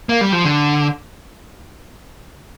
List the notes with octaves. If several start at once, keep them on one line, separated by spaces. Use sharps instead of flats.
A#3
G3
F3
D3